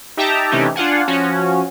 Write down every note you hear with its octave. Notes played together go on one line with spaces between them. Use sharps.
D#4 G4 E5 G5 A5 A#5
C3 E3 A3 C#4 D#4 G4
D4 F4 F5 F#5 G#5
F3 C#4 F#4